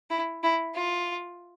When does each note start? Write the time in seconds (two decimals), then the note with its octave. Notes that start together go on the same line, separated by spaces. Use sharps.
0.10 E4
0.43 E4
0.75 F4